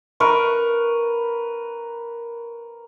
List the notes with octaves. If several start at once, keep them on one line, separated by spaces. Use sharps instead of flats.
A#4 B4 C#6